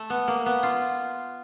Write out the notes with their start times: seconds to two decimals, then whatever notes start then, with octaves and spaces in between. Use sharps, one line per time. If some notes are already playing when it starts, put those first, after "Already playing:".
Already playing: A3
0.10 B3
0.28 A#3
0.46 B3
0.63 F4